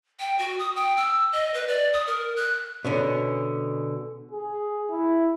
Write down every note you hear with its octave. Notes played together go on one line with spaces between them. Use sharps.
G5
F#4
D#6
G5
E6
D#5
B4
D5
D#6
A#4
F#6
B2 D3 C#4
G#4
E4